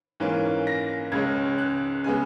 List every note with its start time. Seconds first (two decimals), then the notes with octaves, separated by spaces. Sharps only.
0.20 G#2 E3 A#3 C#4
0.67 A#6
1.12 C#2 C#3 G#3 C#4 G#6
1.58 F#6
2.04 C#3 G#3 B3 G#5